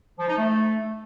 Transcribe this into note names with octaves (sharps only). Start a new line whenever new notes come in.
F3
D#4
A3